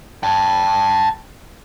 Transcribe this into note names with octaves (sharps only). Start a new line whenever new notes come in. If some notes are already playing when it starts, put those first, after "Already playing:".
G5 A5